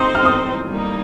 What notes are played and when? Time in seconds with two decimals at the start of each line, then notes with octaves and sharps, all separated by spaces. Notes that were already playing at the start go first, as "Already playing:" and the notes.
Already playing: C4 D#4 C5 C6 D#6
0.15 F6
0.25 D#6
0.69 G3 A#3 D#4